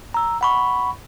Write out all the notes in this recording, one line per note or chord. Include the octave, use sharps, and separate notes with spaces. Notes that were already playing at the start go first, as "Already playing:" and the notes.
A#5 E6
F#5 B5 C#6